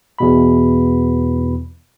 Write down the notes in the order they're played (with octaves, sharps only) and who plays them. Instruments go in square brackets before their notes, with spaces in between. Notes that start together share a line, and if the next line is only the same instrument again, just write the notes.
[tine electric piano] E2 B2 B5